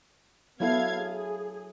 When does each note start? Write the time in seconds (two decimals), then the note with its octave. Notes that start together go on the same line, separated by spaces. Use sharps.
0.60 F#3 B3 E4 A4 F5 G#6
1.01 G#4